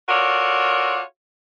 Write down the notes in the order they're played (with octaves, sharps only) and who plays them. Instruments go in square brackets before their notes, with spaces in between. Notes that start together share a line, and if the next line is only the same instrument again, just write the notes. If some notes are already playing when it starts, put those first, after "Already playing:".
[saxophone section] F4 F#4 A4 A#4 C#5 D5